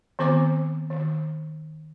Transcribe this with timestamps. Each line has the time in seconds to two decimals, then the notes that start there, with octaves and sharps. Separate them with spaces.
0.19 D#3 B3 C4 C5 D6
0.90 D#3